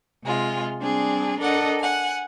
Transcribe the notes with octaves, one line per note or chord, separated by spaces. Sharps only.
C3 G#3 F4
G3 C4 D4 G#4
D4 A4 A#4 D#5 F#5
F#5 G#5